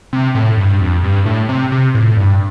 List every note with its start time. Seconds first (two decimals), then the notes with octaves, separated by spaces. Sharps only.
0.13 C3
0.35 A2
0.57 G2
0.81 F2
1.04 G2
1.26 A2
1.49 C3
1.72 C3
1.95 A2
2.17 G2